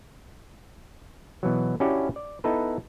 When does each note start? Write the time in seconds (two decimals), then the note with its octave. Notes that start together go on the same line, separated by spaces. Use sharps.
1.43 B2 E3 F#3
1.80 C#4 D4 E4 F#4 G4
2.16 D5
2.44 B3 D#4 E4 A4 B4